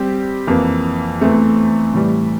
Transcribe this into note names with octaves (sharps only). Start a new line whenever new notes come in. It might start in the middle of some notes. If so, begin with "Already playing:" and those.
Already playing: G3 C4 G4
F2 E3 A#3
E2 E3 A3 C4
A2 E3 G3